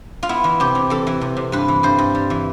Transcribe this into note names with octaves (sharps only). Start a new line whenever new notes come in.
F4
B3 E4
E3
C3 G4
E3
E3 A4
E3
C3
C3
G2 B4
E3
G2 C5
G2
G3
E3